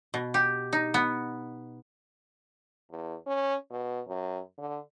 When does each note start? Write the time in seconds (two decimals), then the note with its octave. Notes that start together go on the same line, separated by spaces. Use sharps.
0.14 B2
0.34 G4
0.73 D#4
0.94 B3
2.91 E2
3.27 C#4
3.71 B2
4.08 F#2
4.58 D3